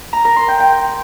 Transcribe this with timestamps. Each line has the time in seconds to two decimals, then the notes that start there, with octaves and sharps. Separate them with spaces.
0.13 A#5
0.25 A#4
0.36 C6
0.48 G5
0.60 G5